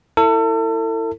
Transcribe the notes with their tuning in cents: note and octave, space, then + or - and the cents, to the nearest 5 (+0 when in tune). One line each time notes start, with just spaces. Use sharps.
E4 +0 A4 +35